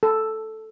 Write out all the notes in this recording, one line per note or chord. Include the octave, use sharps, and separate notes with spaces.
A4